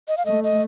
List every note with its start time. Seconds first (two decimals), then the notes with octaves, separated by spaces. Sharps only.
0.08 D#5
0.17 F5
0.26 A3 D#5
0.44 D#5